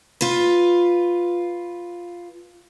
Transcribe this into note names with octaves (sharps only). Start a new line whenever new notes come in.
F4 B4